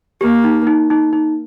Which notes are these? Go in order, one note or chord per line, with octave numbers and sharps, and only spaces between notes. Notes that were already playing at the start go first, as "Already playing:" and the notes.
A#3 G4
D#4
D#4
D#4
D#4